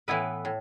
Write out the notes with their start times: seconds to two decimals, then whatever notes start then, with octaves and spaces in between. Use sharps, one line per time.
0.08 A2 E3 B3 E4 B4
0.45 A2